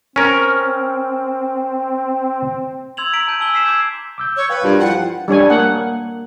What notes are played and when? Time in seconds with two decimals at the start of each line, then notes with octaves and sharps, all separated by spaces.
0.16 C4 C#4 A#4
2.97 C6 E6 G#6 F7 F#7
3.13 A#5 B6 D7 F#7
3.28 A5 G6
3.40 G#5 E6 F#7 G7
3.54 E6 B6 C7 E7
3.65 D6 E6 G6 G#6
4.18 D6 E6 G6
4.36 C#5
4.49 B4 F5 G5
4.64 G2 F4 G4 A#4
4.80 F3 E4 F#5 G5
5.28 G3 D4 C#5 G#5
5.50 A#3 F#5